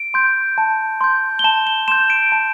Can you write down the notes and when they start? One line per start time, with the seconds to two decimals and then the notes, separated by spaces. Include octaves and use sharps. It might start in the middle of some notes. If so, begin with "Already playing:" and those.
Already playing: D7
0.14 C6 G6
0.58 A5
1.01 C6 G6
1.39 G7
1.44 A5 E7
1.67 G7
1.88 C6 G6 E7
2.10 D7
2.32 A5